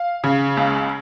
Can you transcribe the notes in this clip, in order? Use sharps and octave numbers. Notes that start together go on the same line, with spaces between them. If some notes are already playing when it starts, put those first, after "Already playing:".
Already playing: F5
C#3
C#2